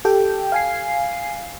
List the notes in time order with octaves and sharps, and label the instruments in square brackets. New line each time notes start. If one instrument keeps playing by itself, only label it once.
[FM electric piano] G4 A4 G5
F5 G#5 C7